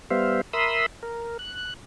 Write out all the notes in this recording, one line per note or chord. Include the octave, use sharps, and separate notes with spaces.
G3 B3 C5 E5 F5
A#4 E5 B5 C6 D#6 E6
A#4
F#6